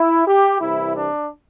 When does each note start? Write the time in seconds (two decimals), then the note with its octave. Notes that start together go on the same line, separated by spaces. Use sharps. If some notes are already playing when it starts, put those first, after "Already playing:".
Already playing: E4
0.27 G4
0.60 C2 C3 E3 E4
0.94 D4